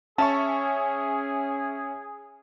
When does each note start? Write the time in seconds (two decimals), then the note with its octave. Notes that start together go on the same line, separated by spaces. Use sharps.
0.18 C#4 G#4 E5 A5 C#6